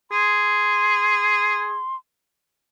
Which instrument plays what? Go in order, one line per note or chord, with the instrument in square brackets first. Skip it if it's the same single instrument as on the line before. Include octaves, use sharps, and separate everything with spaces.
[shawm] G#4 [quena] C6